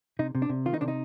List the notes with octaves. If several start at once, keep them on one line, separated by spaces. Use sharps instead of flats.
C3 D#4
C3
D4
C3
D#3 F4
D#4
C3 D4
D#4